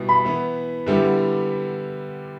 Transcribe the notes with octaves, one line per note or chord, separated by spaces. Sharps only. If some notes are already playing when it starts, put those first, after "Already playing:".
Already playing: B2 G3 B3 E4
B5
E3 B3 E4
D3 G3 B3 E4 G4